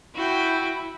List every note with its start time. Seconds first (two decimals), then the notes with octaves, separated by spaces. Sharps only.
0.15 E4 F#4 G5